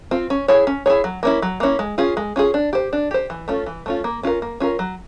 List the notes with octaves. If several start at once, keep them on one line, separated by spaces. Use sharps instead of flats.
C4 F4
C#4
E4 G#4 C#5
C#4
E4 G#4 C#5
F#3
A#3 C#4 E4
F#3
A#3 C#4 E4
G#3
C#4 F4 G#4
G#3
C#4 F4 G#4
D4
G4 C5
D4
G4 C5
E3
A3 C#4 F4
E3
A3 C#4 F4
A#3
C#4 F4 A#4
A#3
C#4 F4 A#4
F#3